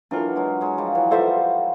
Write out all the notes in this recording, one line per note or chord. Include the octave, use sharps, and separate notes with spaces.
E3 F#3 D4 F4 A#4
F#3 G#3
F#3 G#3
F3 G3
E3 F#3
F3 G3 F4 A4 C5 E5